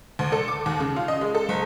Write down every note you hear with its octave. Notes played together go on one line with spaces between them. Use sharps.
D2
A4
D6
D#2
C#3
F4
D#5
G#3
A4
F#1